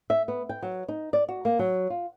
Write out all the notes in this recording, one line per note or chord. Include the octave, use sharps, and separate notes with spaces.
E5
B3
G5
F#3
D#4
D5
F#4
A#3
F#3
F4